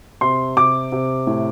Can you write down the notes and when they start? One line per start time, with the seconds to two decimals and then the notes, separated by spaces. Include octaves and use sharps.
0.21 C3 C6
0.57 C3 D6
0.92 C3
1.27 A2